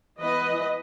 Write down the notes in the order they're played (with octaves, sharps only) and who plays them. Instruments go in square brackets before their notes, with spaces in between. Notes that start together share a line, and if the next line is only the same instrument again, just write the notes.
[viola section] E3 B3 B4 D#5